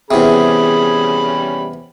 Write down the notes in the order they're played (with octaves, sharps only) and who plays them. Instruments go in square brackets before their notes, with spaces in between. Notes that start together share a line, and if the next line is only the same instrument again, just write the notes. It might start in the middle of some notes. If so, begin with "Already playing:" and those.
[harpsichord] E2 C3 [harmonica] G3 C#4 B5 [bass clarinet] G#4